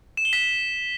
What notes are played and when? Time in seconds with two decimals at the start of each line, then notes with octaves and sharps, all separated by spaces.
0.17 E7
0.25 G7
0.33 B6